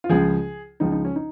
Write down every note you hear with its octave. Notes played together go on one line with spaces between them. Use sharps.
F4
C#2 C#3 F3 G#4
C#2 C#3 F3 D#4
D#4
C#4
D#4